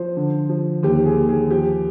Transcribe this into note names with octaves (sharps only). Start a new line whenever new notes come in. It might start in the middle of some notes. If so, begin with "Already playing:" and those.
Already playing: F3 C5
D3
F3
D#2 G4
G#4
D#2
G#4
F3 G4